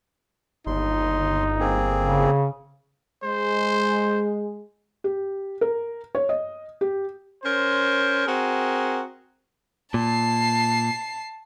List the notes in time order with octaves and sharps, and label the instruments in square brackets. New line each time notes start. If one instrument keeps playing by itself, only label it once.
[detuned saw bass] G1 [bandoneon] D#2 C6 [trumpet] D#4
[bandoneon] A#3 C4 G#4
[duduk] C#3
[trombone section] G#3 [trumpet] C5
[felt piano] G4
A#4
C#5
D#5
G4
[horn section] C#4 A#4 C5
C4 F#4 G#4 A#4
[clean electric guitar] A#2 [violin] A5 C7